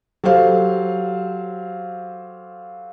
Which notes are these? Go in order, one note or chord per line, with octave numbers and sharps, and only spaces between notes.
F#3 G4 A4 C5 F5